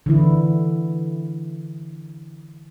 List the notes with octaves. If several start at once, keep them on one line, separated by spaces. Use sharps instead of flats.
D3 E3 E4